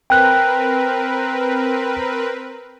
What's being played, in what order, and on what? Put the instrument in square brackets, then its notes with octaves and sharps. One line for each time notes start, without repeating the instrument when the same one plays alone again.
[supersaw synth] C4 A#4 B4 [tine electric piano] G5 F#6